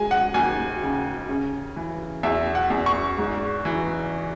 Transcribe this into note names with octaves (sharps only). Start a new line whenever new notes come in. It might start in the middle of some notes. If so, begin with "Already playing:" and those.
Already playing: G#3 G#5
F#5
D#2 G#5
C#3
C#3
E3
E2 E5
F#5
E2
C#6
G#2
E3